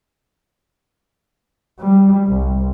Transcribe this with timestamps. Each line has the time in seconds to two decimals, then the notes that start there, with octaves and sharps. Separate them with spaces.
1.80 G3
2.27 C2